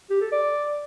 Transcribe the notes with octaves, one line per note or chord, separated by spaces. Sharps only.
G4
A4
D5